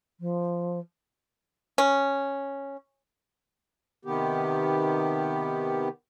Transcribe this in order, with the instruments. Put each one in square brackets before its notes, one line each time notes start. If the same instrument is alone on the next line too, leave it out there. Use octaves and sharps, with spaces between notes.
[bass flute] F3
[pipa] C#4
[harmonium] C3 D#3 B3 G4